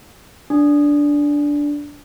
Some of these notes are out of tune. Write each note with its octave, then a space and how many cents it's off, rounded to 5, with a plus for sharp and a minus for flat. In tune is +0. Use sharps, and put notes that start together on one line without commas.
D4 -10